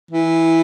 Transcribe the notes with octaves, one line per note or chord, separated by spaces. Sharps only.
E3